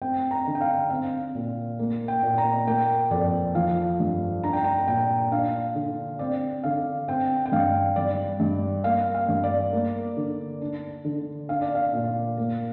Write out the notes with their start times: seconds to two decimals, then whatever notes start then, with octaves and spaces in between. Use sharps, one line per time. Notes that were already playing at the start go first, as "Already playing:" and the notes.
0.02 C4 G5
0.31 A#5
0.47 D3
0.55 G5
0.61 F5
0.90 C4 F5
1.35 A#2
1.79 A#3
2.08 G5
2.23 A#2
2.38 A#5
2.67 A#3 G5
3.11 F2 D5
3.55 F3 F5
4.00 G2
4.43 D4 A#5
4.53 G5
4.64 A#5
4.87 A#2 G5
5.31 D4 F5
5.75 D3
6.19 C4 D5
6.64 D3 F5
7.08 C4 G5
7.46 G5
7.52 G2 F5
7.96 G3 D5
8.40 G2
8.84 A#3 F5
9.15 F5
9.28 G2
9.44 D5
9.73 A#3
10.17 D3
10.61 D4
11.05 D3
11.49 D4 F5
11.62 D5
11.75 F5
11.93 A#2
12.37 A#3